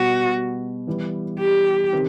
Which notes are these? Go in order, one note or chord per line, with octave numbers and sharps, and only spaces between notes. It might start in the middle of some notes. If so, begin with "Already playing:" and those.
Already playing: B2 G3 B3 F#4
E3 G3 B3
G4
C3 D#3